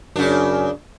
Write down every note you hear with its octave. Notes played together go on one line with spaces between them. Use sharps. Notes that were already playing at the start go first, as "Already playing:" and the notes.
F#2 C#3 D4